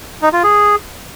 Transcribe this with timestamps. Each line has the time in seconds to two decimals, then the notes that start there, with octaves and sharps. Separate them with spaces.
0.22 D#4
0.33 F4
0.44 G#4